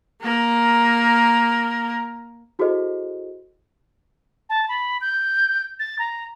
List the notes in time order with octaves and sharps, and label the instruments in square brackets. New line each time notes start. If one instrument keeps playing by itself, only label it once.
[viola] A#3 A#4
[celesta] E4 F#4 G#4 A4 C5 D#5
[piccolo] A5
B5
G6
A6
A#5